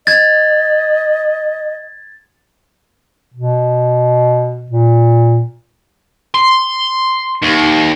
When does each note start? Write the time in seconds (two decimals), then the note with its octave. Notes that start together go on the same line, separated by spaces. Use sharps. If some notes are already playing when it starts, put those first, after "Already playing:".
0.07 D#5 G#6 A6
3.34 B2
4.70 A#2
6.34 C6
7.42 D#2